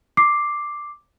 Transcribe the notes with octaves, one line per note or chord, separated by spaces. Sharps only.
D6 C7